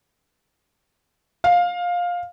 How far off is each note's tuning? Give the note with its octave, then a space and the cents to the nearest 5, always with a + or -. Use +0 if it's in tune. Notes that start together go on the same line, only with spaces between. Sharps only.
F5 +15